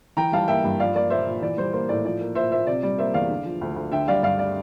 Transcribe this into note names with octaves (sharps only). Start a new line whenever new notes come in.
E3 G5 A#5
G3 F5 A5
A#3 E5 G5
G2
F3 D5 F5
A#3 D5
A#2 C5 E5
A#2
E3 D5
G3 C5
A#3 C5
A2 D5
F3 D5
A#3
A#2 C5 E5
A#2 C5 E5
C3 D5
G3 D5
A#3 C5 E5
E2 D5 F5
D3
F3
D2
D2
D3 E5 G5
G3 D5 F5
G2 D5 F5
D5